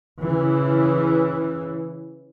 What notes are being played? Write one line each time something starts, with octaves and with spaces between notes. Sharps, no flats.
C#3 E3